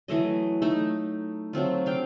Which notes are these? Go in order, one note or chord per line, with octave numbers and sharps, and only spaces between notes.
E3 F#3 A3 D#5
A3 D#4
F#3 A3 C4 F4
D4 F5 G5